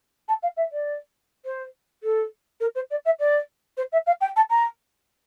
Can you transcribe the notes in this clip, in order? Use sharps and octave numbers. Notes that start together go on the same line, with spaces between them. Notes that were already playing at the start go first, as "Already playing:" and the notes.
A5
F5
E5
D5
C5
A4
A#4
C5
D5
E5
D5
C5
E5
F5
G5
A5
A#5